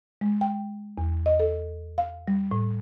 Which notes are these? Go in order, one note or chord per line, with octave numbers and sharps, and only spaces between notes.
G#3
G5
E2
D#5
A4
F5
G3
A2